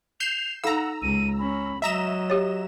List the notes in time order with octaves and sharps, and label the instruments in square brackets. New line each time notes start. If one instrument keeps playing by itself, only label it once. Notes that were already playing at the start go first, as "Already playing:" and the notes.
[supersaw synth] G6 C7 E7 [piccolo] F7
[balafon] D#4 A4 F5 [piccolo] F#5 [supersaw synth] A#5 E6
[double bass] C#2 [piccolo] D#7
[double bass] C#4 [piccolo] B5
[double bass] F#3 [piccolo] D#5 [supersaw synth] E5 A#5 E7
[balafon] G4 C#5